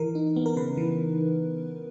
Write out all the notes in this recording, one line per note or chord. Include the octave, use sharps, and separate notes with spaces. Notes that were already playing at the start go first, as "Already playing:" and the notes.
Already playing: E3 A#4
D#4
B3
A#4
C#3 B4
E3